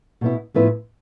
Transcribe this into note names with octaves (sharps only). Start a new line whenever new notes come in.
B2 B3 E4
A2 F3 B3 E4 B4